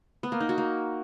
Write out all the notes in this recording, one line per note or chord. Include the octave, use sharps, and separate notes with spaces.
B3
A#3
D#4
F#4
A#3